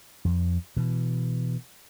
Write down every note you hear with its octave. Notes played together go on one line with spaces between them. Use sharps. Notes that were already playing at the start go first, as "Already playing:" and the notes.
F2 F3
B2 E3